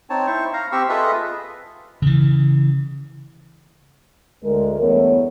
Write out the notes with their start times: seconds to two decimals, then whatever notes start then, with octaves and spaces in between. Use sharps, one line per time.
0.10 C4 D#4 C#5 A5
0.27 E4 C5 C#6
0.53 F5 A#5
0.72 C4 G4 C#6 E6
0.89 F4 G#4 A4 B4 D#5 E5
2.02 C#3 E3
4.44 D2 G#3 A#4
4.81 E2 G2 E3 A3 B3 C#5